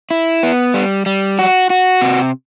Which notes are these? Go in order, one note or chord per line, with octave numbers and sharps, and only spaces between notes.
E4
B3
G3
G3
F#4
F#4
C3